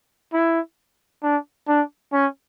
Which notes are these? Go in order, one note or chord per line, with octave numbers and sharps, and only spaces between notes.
E4
D4
D4
C#4